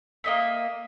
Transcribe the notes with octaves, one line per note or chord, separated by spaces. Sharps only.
A#3 D#5 E5